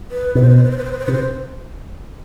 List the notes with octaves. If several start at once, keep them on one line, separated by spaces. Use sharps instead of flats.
B4
B2 B4
C5
B4
C5
B4
C5
B4
C5
B4
C5
C3 B4
C5